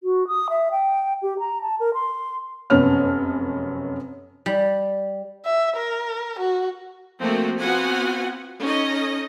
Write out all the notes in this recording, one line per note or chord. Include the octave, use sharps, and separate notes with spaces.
F#4
D#6
E5
G5
G4
A#5
A5
A#4
C6
F1 F#2 B3 C#4 F6
G3
E5
A#4
F#4
F3 A3 A#3 C4 F#4
B3 C4 F4 F#4 F#5 G#5
C#4 D#4 A4 D#5